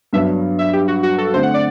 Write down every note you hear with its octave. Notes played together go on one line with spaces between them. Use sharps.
G2 F#3 B3 D4 E5
E5
G4
F#4
F#4
A4
D3 A3 C4 C5
F#5
D5